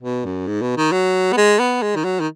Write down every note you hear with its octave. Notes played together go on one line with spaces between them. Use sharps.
B2
F#2
G#2
B2
D#3
F#3
B3
G#3
B3
G#3
D#3
F#3
D#3